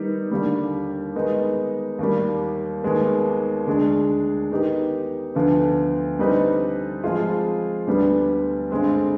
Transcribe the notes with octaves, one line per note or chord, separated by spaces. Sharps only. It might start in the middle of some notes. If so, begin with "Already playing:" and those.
Already playing: D#3 G3 B3 D#4
D#2 D3 G3
D#3 G#3 B3 D#4
D#2 D#3 G3
D#2 D#3 G#3 B3
D2 D3 G#3 D4 G#4
D#3 B3 D#4 G4
D2 D3 F3 B3
D3 G3 C4 D#4 B4
F3 G#3 C4 F4 G#4
D2 D3 G3 B3
G2 D3 G#3 C4